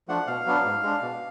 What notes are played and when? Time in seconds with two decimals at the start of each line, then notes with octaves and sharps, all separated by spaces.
0.08 F3 A3 D4 F#5
0.27 B2 F5
0.46 F#3 B3 D4
0.65 G#2
0.83 G#3 D4
1.02 B2